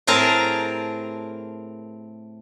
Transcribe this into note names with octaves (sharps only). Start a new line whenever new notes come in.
A2 C4 G#4 A#4 A5 A#5